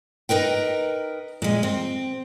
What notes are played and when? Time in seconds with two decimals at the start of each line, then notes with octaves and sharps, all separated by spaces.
0.29 D#4 A#4 B4 G5
1.42 A#2 G#3
1.63 C4